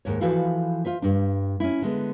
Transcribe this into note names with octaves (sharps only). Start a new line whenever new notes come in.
D#2 G#2 C#5
E3 F3 E4 F#4 A4 F5
F4 C5 E5
G2 D4
C#4 E4
D3 G#3 B3